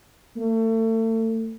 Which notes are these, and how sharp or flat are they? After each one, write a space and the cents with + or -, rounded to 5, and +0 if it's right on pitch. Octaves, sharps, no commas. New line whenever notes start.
A3 +35